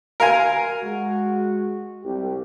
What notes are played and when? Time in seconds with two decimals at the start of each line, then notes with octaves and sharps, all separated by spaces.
0.20 A#4 F5 G#5
0.83 G#3 F#4
2.04 C2 G4